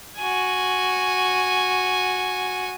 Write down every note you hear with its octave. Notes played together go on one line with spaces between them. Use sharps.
F#4 G#5